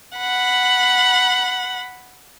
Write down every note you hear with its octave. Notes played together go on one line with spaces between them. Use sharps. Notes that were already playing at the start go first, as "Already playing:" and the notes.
F#5 B5